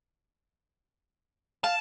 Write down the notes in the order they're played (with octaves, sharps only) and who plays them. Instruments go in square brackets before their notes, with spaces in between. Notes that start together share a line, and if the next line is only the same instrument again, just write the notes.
[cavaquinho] F5 [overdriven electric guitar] A5